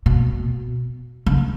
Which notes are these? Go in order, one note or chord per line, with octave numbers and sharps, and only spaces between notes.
B2
C#3